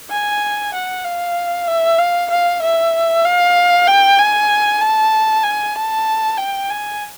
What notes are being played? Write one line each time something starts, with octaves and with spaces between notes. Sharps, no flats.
G#5
F#5
F5
E5
F5
F5
E5
F5
G5
G#5
A5
G#5
A5
G5
G#5